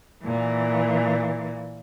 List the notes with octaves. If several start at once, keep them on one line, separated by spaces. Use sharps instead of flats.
A#2 E3